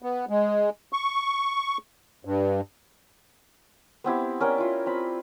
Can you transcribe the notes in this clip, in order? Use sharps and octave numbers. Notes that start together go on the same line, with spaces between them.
B3
G#3
C#6
G2
B3 C4 E4 G4
C#4 A#4 D5 G5
E4 F4
C4 B5